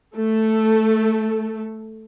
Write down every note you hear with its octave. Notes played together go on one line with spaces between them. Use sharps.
A3 A4